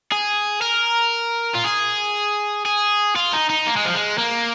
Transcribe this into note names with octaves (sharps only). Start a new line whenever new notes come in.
G#4
A#4
F4
G#4
G#4
F4
D#4
D#4
A#3
G#3
F3
G#3
A#3